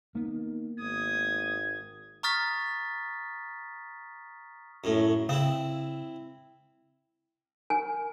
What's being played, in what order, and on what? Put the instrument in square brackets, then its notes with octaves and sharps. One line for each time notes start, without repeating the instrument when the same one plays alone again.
[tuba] D#3 [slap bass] A#3 B3
[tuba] G#1 [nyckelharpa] D#6 [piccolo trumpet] G#6
[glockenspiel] A#5 C#6 D#6 F6 A6 B6
[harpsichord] F#2 A2
[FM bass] C#3 [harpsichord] C4 E4
[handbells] A#4 [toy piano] G#5